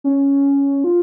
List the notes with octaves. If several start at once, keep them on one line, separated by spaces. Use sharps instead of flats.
C#4
F4